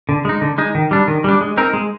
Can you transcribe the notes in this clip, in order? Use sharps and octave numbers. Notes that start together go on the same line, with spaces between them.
D3
G#3 D#4
D3
G#3 D#4
D#3
G3 D4
D#3
G3 D4
G#3
C4 D#4 A#4
G#3